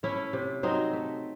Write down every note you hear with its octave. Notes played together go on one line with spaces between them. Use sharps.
A3 C#4 E4
C3
F#3 C4 D#4
A3